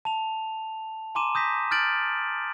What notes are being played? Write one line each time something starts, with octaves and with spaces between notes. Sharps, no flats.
A5 F7
G#5 A#5 C6 D6 D#7 E7
D#6 G6 A#6 B6
F6 G6 A6 D7 F#7